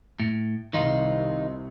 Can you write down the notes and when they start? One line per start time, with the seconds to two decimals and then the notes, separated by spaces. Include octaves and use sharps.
0.20 A2
0.73 C2 C3 D#3 D#4 F4